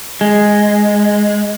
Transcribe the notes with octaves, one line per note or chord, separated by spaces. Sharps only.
G#3